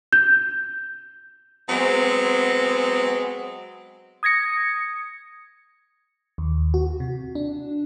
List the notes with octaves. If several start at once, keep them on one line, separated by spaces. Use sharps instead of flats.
G6
F#3 G#3 B3 C4
D#6 G#6 A#6 C#7
D#2
F#4
C3
D4